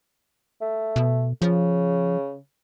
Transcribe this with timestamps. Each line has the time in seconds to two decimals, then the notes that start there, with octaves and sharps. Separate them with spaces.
0.61 A3
0.96 B2
1.42 C#3 F3